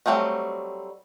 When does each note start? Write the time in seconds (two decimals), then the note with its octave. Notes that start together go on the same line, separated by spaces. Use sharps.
0.06 F#3 G3 A3 C4 D#5